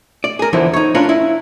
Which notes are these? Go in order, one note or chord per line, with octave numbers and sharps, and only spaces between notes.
D5
G#4 A#4
E2 D3 F3 E4
D#4 C#5
C#4 D4 F4 A#4 B4
E4